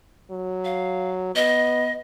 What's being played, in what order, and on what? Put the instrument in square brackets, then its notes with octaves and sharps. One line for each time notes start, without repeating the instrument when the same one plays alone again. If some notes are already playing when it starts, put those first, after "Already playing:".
[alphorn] F#3
[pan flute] F5
[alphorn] B3 [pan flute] D#5